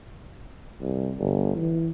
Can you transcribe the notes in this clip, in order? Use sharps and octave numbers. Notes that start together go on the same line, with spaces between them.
C2
G1
E3